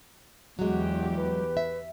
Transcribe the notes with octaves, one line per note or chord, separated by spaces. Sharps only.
E2 F#3 G#3 F#4 G4
B4
E5